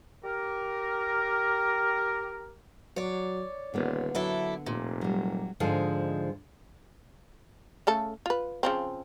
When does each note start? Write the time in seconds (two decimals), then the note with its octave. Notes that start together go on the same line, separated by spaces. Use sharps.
0.24 G4 A#4
2.96 F#3 C#5 D5
3.74 D#1 D3 A#3 B3
4.15 F#3 D4 E4 A4
4.66 F1 A#2
5.01 F#3 G3
5.60 G#2 D3 F3 G#3 D#4
7.87 C#3 A3 A4
8.26 F4 B4
8.63 C#3 F3 C4